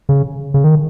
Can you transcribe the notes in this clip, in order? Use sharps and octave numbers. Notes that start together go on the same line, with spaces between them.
C#3
C#3
D#3